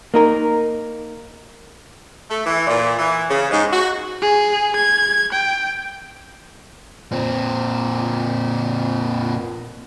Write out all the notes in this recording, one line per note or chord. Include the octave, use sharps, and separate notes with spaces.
A#3 D#4 A#4
A3
E3
A#2
E3
C#3
G#2
F#4
G#4
G#6
G5
A#2 C4